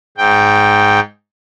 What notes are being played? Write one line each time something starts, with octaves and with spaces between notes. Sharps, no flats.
G#2 G5